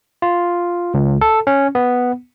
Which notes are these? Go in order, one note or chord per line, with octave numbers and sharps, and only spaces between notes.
F4
C#2
A4
C#4
B3